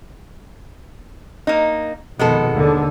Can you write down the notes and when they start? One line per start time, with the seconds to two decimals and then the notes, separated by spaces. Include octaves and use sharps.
1.47 A#3 D#4
2.19 F2 B2 D#3 G#3 B3 A4
2.53 D#2 D3